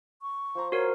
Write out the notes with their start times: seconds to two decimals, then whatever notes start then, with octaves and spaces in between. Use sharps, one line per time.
0.22 C#6
0.55 F3 C5 A#5
0.72 F#4 A#4 C#5